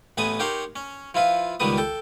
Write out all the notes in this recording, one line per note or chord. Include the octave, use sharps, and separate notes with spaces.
A1 A2 B3 B4 G#5 D#6
D#4 G4 A#4 C#5 F#5 C6
C#4
F3 E4 F4 B4
C#2 D#3 G3 B3 B4 D#6
A4 G5